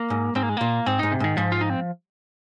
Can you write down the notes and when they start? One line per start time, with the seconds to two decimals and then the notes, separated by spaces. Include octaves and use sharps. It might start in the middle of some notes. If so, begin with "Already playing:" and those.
Already playing: A#3
0.10 G#2
0.35 G#2 C4
0.43 A#3
0.49 G#3
0.57 A#2 A#3
0.86 G#2 C4
0.99 G#2 D#4
1.12 C3
1.20 G#2 D#3
1.37 G#2 F3
1.52 F4
1.61 D#4
1.70 C4